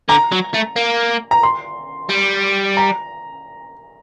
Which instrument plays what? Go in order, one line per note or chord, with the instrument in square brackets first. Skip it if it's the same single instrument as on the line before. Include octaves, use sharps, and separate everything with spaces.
[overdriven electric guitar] D3 [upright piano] A#5
[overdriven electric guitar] F#3
A3
A#3
[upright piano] A#5
C6
[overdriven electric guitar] G3
[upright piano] A#5